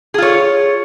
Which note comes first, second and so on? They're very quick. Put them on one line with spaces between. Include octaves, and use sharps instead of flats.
G#4 F4 C#5